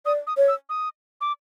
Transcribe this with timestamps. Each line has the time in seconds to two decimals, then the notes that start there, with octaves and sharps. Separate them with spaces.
0.06 D5 D#6
0.27 D#6
0.37 C#5
0.48 E6
0.69 D#6
1.21 D6